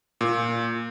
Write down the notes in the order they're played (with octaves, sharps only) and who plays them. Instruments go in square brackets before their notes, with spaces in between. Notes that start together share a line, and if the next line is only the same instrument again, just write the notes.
[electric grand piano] A#2